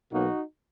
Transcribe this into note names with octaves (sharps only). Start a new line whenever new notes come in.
B1 B2 F#3 A#3 D#4 F#4